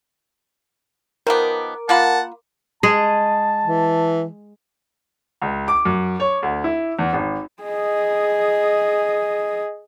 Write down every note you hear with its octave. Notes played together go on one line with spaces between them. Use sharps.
D#3 F3 B3 A#4 D6
A#3 F4 F#5 A5 B5
G#3 G#4 D#5 A5
E3
C#2
D6
F#2
C#5
D2
E4
E2
G#1
G#4 D#5